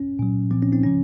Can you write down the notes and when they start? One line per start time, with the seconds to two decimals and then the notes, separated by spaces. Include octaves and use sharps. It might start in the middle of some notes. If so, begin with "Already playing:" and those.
Already playing: C#4
0.19 A#2 F#3
0.51 A#2 F3 C4
0.62 C#4
0.72 C4 D#4
0.83 C#3 F3 C#4